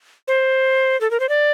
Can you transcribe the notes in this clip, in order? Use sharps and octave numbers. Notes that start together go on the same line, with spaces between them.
C5
A4
A#4
C5
D5